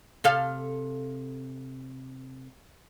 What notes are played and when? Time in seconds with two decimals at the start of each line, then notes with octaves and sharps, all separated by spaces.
0.24 C3 A4 F5